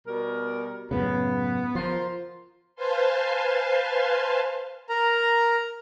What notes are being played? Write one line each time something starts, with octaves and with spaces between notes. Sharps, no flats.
B2 G3 A#4
F#2 A2 C#3 B3
F3 F4 A#4 C5
B4 C5 F5 G#5 A5 C6
A#4 A#5